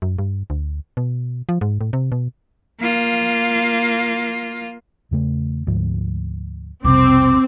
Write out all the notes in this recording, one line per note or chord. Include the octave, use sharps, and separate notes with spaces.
F#2
G2
D2
B2
F3
G#2
A2
C3
B2
A#3 F4
E2 C#3 A3
D2 G#2 F3
B1 F2 C3 G3 C4 D6